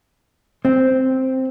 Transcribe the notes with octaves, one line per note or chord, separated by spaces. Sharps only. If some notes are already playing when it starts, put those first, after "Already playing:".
C4